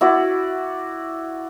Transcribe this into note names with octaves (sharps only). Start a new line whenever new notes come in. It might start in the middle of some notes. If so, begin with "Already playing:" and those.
E4 F#4 D5